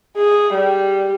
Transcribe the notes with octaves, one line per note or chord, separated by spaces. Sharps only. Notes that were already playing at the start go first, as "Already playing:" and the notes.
G#4
G3